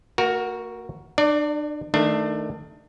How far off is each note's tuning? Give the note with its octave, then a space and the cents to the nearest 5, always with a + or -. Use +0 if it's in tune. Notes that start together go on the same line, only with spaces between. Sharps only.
A#3 -45 F#4 +0 A#4 +15
D4 +40 D5 +0
D#3 +15 A3 +0 D4 +25